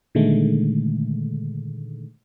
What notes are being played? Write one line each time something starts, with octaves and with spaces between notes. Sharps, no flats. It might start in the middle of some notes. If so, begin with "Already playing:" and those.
A#2 D3 D#3 G#3 A3